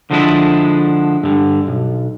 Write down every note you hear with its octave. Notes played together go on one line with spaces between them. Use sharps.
D3 F3 G#3 D4 E4
G2 D3
B1